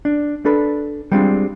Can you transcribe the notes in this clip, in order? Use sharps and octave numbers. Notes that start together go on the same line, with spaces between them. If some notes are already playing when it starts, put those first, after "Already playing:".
D4
D4 A4 B4
G3 G#3 C4 D4 F4